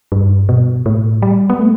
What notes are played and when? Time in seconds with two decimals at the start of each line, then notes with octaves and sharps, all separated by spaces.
0.12 G2
0.49 B2
0.86 A2
1.22 G3
1.50 B3
1.60 A3